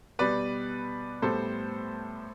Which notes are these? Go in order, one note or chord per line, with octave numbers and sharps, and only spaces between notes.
B2 G3 B3 B4 D5
A2 G3 B3 A4 C5